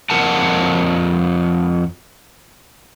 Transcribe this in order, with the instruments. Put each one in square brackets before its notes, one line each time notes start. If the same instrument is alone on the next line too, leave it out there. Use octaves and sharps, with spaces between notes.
[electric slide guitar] F2 A#4 F#5 A5